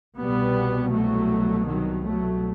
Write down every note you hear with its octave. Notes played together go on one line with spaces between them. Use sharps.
C2 B2 G3 B3
F#3 A3
D#3 F#3
F#3 A3